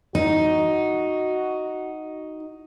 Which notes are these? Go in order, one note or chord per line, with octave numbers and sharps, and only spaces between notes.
D#4 F#4